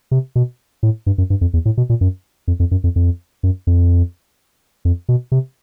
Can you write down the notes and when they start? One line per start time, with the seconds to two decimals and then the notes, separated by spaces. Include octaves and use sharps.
0.11 C3
0.36 B2
0.83 A2
1.06 G2
1.18 F#2
1.30 G2
1.41 F2
1.54 E2
1.65 A2
1.77 B2
1.90 A#2
2.01 F#2
2.48 F2
2.60 F2
2.71 F#2
2.84 F2
2.96 F2
3.43 F#2
3.67 F2
4.85 F2
5.09 B2
5.32 C3